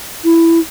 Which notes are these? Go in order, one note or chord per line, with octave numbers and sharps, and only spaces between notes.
E4